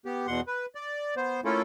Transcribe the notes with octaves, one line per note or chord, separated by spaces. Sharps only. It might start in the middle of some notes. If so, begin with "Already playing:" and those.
B3 G4
E2 B2 F#5 C6
B4
D5
B3 C5
A3 A#3 C#4 E4 F4 A4